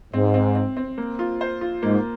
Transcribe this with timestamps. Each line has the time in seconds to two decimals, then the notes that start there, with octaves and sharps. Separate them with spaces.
0.14 G#2 C4
0.34 C4
0.56 C4
0.77 C4
0.98 A#3
1.19 F4
1.41 C5
1.61 F4
1.83 G#2 A#3